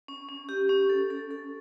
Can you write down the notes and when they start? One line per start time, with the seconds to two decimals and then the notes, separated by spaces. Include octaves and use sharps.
0.08 C#4
0.29 C#4
0.49 G4
0.69 C#4
0.89 A4
1.10 A4
1.30 A4